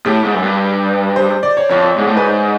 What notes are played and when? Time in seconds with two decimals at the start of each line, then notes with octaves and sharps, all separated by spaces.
0.06 A2 G4
0.24 G#2
0.34 F#2
0.43 G2
1.16 C5
1.43 D5
1.57 C#5
1.70 F2 C#5
1.98 G#2
2.07 A2
2.15 G#2 B4
2.27 C5